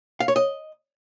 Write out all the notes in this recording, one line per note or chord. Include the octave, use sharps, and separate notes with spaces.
F5
C#5
D#5